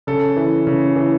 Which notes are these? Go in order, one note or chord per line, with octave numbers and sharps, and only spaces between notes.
C#3 A4
E3
C#3
E3